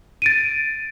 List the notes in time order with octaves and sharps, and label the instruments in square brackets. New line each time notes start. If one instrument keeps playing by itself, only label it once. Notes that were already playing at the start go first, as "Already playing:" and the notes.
[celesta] A6 D7 D#7